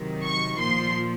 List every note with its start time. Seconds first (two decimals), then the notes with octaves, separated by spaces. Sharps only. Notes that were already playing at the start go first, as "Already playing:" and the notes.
Already playing: C3 D#3 F#3
0.23 C#6
0.59 A#2 F3 C6